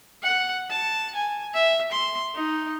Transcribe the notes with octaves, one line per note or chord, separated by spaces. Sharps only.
F#5
A5
G#5
E5
C6
D#4